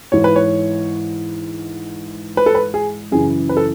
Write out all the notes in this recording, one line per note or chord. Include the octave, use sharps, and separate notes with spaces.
G#2 E3 C#5
B4
C#5
B4
A4
B4
G#4
F#2 C#3 E3 G#4
B4
A4